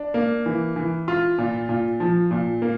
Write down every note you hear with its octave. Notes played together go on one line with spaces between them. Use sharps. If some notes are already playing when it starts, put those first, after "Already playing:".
Already playing: D4
A#3
E3
E3
F4
A#2
A#2
F3
A#2
A#3